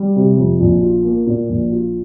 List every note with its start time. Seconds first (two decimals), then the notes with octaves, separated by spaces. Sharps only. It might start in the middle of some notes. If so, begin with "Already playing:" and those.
Already playing: G3
0.16 C3
0.37 F2
0.60 A#1
0.82 F4
1.05 A#3
1.26 A#2
1.49 A#1
1.72 F4